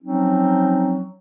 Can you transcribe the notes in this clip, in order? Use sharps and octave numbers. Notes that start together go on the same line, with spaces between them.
F3 F#3 C4 C#4 D#4